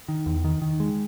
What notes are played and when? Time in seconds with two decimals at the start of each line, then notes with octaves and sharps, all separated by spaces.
0.08 D#3
0.26 E2
0.44 D#3
0.62 D#3
0.80 G#3